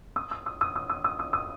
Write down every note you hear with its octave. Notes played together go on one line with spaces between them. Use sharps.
D#6
D#6
D#6
D#6
D#6
D#6
D#6
D#6
D#6